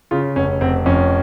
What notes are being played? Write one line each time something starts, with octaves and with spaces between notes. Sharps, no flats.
C#3 F4
F1 C#4
F1 C4
F2 C#4